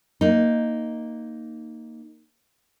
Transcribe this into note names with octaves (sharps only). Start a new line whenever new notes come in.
A#3 D#4